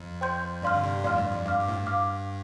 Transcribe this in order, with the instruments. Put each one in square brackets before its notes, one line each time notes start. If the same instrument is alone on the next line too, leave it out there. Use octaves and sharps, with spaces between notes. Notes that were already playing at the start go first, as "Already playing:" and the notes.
Already playing: [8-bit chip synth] F2
[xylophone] C5 G5 C6 G6
[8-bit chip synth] G2 [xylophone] D5 F5 C6 F6
[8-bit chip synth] D3
G2 C3
[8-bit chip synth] F2 A2 [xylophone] D5 F5 C6 F6
[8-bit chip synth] G2
F2
[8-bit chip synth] G2 [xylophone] F5 D6 F6
[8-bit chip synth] G2
A2
G2
[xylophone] F5 D6 F6